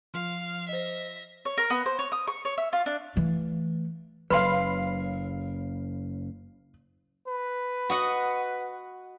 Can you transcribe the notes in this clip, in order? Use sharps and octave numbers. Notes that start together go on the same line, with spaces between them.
F3 F5
C5 D#5 E5 A#6
C#5
A#4
B3
C5
C#5
D#6
C#6
C#5
E5
F4
D4
E3 A3
F#1 F#3 B4 F5 B5 C6
B4
F#4 D#5 F#5